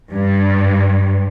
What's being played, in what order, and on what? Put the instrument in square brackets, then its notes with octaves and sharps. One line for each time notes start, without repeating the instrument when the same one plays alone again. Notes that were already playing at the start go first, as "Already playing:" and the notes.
[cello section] G2